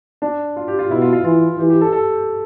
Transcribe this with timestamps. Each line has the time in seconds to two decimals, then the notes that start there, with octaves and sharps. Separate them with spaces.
0.22 D4
0.56 F4
0.68 G4
0.79 F4
0.91 B2 E4
1.02 F4
1.13 F4
1.24 E3 F4
1.58 E3 G4
1.70 G4
1.81 A4
1.92 A4